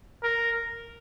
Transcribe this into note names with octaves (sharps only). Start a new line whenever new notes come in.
A#4